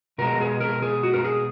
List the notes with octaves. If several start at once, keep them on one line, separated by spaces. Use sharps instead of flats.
B2 G#3 A#4
G#4
A#4
G#4
F#4
A#4
G#4